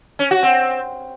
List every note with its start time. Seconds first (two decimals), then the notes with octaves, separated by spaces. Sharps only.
0.19 C#4
0.31 F#4
0.43 C4